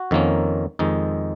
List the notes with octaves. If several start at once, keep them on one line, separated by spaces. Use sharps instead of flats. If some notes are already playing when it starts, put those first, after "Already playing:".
Already playing: F#4
F2 D#3 A#3 C#4
F2 D#3 G#3 D#4